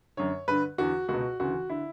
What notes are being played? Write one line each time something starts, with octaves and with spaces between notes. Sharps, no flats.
F#2 D3 C#5
G2 D3 B4
E2 D3 F#4
C#2 F#4
B2
D2 C#3 E3 F#4
D3 E4